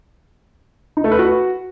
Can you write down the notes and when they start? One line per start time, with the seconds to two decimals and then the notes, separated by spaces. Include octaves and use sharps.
0.97 D#4
1.04 A3
1.12 B4
1.19 F#4